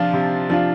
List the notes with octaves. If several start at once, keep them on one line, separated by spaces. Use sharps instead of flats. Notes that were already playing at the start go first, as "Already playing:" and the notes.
Already playing: C3 F3 D4 F4
C3
F3 D4 F4